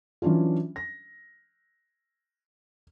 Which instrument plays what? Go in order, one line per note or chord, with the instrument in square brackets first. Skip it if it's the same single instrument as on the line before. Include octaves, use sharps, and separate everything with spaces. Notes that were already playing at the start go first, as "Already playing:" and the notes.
[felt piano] E3 F#3 C#4 D4 F4
A#6